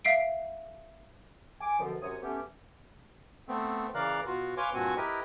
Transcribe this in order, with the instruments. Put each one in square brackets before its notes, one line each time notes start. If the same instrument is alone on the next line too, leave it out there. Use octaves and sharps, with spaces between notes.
[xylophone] E5 F5 C7 D7
[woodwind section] G#5 D6
F#2 B2 D3 F3
F#2 C3 C#5 D#6
A3 B3 C#4 G4
[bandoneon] A3 B3 C4
C#3 E3 A#4 D5 F5 F#6
B2 F4 F#4
B4 C#5 F5 G#5 C6 D6
G2 A#2 C4 F#4 G#5 C#6
E4 G4 A#4 B4 D#5